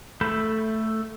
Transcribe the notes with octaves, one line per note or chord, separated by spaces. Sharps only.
A3 A4 B5 G6